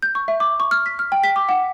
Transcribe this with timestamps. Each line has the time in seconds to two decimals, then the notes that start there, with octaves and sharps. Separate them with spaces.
0.02 G6
0.15 C#6
0.28 E5
0.40 D6
0.60 C#6
0.71 F6
0.86 B6
0.99 F6
1.12 G5
1.24 B6
1.36 D6
1.49 F#5